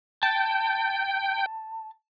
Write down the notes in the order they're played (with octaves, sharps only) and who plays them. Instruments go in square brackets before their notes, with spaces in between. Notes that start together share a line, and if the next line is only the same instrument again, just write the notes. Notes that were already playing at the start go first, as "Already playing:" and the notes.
[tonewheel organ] G5 [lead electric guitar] A5